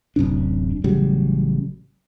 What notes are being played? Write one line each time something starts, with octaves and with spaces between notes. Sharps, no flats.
D1 F#2 C3 D4
A1 C#3 F#3 G3